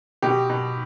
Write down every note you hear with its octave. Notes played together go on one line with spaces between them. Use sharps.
B2 G4
B2